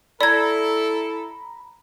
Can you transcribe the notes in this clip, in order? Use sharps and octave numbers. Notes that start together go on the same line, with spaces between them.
E4 A4 D5 A#5 B5 G#6